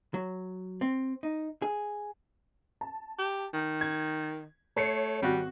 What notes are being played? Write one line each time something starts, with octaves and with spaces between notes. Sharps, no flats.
F#3
C4
D#4
G#4
A5
G4
D#3
G#6
A3 C#5 C7 C#7
G#1 G3 F#4